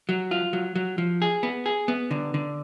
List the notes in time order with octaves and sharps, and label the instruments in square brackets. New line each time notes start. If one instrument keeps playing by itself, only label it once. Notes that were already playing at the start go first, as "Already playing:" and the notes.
[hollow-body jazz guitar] F#3
F4
F#3
F#3
F3
G#4
B3
G#4
B3
D3
D3